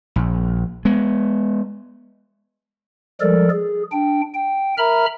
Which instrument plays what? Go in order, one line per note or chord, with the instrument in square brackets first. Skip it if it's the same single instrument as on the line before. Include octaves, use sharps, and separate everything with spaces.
[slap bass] A#1
G#3 B3
[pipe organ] F3 G3 G#3 A4 A#4 D5
G#4
D4 G5
G5
A#4 E5 A#5 B5 F6